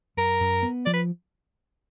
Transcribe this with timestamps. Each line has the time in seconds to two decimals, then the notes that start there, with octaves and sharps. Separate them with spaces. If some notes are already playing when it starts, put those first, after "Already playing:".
0.17 F#2 A#4
0.40 F#2
0.63 B3
0.86 F3 D5
0.94 B4